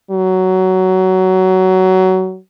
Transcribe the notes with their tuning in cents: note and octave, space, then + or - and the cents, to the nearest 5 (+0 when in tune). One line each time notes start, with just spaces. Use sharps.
F#3 +15